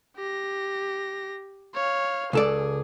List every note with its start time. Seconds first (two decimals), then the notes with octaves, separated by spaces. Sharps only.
0.17 G4 A#6
1.74 C#5 F5
2.33 C#2 G#4 A4 D5